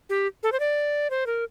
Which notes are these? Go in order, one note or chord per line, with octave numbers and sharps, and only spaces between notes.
G4
A4
C5
D5
C5
A#4